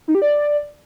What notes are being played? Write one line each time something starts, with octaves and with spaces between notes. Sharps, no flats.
D#4
G4
D5